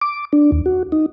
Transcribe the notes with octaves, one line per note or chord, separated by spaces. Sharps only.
D6
D4
D#2
F#4
D#4